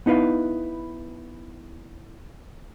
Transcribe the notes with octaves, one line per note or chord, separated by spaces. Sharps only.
B3 D#4 E4 B4 F5